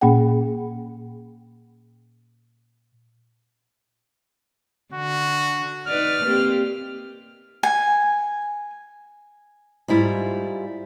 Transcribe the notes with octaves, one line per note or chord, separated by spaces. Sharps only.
A#2 A#3 C#4 G#4 F#5 G5
D3 F#4
D#4 B4 D5 F6
A#3 C4 G4
G#5
G#2 G3 E4 F4